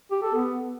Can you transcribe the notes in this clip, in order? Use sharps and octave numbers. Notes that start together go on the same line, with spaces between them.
G4
A4
B3